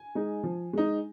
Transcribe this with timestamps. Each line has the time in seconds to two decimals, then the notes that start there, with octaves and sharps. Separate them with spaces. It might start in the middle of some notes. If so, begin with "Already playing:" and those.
Already playing: G#5
0.15 G#3 D#4
0.43 F3
0.73 G#3 D#4